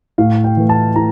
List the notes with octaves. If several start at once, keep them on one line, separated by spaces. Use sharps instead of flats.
A2 F5
G5
E3 A3
A5
A2 A#5